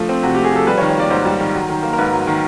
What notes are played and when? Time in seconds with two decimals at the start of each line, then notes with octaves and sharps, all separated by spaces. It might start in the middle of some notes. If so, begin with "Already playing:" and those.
Already playing: F3 A3 D4
0.09 C4
0.23 C3 F#4
0.35 A3 G4
0.45 G#4
0.52 F3 A4
0.67 G3 B4
0.78 C#5
0.81 D#3
0.89 C#5
0.97 A#3 D5
1.10 G#2 C5
1.26 G3
1.40 D#3
1.54 F#3
1.69 D#3
1.83 A#3
1.93 A#4
1.98 G#2 B4
2.12 F#3
2.27 D#3